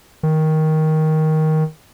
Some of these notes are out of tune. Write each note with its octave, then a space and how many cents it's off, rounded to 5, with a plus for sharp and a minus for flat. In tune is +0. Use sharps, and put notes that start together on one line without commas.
D#3 +10